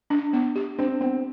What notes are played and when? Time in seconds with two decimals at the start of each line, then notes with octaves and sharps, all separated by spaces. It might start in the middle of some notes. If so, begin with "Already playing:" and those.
0.10 D4
0.33 B3
0.56 G4
0.79 C4 D4
1.01 B3 C4